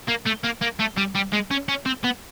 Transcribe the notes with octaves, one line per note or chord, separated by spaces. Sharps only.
A#3
A3
A#3
A#3
A3
G3
G3
G#3
C#4
C#4
C4
B3